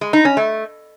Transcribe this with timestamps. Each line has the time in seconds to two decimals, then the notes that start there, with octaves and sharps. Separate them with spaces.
0.01 G#3
0.13 D#4
0.25 C#4
0.37 A3